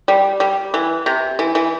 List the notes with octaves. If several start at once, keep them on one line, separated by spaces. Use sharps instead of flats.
G3
G3
E3
C3
E3
E3